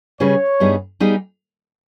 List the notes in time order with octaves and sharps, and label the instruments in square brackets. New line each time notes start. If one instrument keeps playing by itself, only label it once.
[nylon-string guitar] C#3 G3 C#4 G#4 B4 [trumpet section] C#5
[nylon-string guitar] G2 G3 B3 D#4 G#4
G3 B3 D#4 G#4